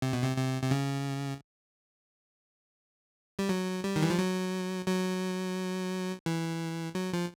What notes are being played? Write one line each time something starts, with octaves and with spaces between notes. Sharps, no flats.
C3
B2
C3
C3
C3
C#3
G3
F#3
G3
D#3
E3
F3
F#3
F#3
E3
F#3
F3